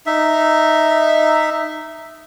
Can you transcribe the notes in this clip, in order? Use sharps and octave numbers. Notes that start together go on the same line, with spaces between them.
D#4 E5